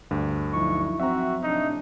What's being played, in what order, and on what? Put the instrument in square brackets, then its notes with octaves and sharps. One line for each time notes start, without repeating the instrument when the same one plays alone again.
[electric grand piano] D2 G2
[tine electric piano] F3 F#3 [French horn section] D#4 E4 [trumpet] C#6
[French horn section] C4 [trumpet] F#4 [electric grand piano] E5 A#5
[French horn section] A2 C3 D4 [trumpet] D#4